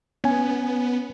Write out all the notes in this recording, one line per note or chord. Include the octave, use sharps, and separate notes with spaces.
B3 C#4 G#5